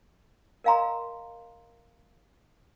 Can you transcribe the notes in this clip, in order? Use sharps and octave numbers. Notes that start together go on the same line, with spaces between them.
A#4 D#5 F5 G#5 A#5 C6